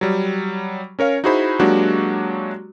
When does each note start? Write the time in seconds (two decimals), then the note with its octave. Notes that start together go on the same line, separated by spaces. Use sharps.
0.01 F#3 G3
0.99 C#4 A#4 C#5 F5
1.24 D#4 E4 F#4 G#4 C5 B5
1.59 F#3 G#3 A#3 D4 F#4 G4